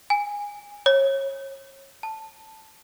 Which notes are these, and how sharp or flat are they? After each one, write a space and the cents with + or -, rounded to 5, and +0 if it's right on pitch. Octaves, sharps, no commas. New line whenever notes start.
G#5 -15
C#5 -30
A5 +0